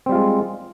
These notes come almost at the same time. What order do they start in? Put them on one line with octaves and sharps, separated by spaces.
C4 G3 F4 G#3